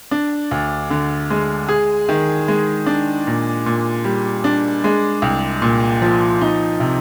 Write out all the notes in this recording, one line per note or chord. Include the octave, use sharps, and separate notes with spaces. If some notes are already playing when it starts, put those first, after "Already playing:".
D4
D2
D3
G#3
G#4
D#3
G#3
D4
A#2
A#2
G3
D4
G#3
C2
A#2
F3
D#4
C3